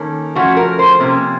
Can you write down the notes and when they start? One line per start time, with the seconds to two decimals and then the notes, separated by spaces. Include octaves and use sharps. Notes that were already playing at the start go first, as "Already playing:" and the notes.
Already playing: D#3 A#3 C#4 A4
0.35 F3 A3 C#4 F#4
0.57 A#4
0.79 C5
1.00 C3 F3 A#3 C#4